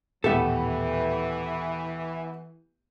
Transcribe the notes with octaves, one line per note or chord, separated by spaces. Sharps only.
D#1 A2 E3 A3 B3 G4 A4 E5